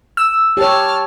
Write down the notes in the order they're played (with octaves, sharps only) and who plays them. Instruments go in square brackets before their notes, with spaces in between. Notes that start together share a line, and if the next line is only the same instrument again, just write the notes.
[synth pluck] E6
[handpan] G4 C#5 [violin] A5 F6